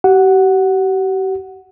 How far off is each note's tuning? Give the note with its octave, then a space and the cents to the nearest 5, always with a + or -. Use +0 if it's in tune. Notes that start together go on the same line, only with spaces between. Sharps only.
G4 -40 F#5 +0